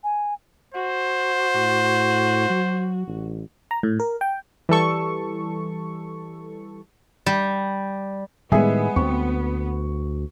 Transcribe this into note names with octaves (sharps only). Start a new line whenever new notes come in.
G#5
F#4 C5
A2
F#3
A1
A#5
A2
A#4
G5
E3 G3 A4 C#6
G3
A2 D#3 G3 G#3 B3 G#4 E5 G#5
D2 C4 C#6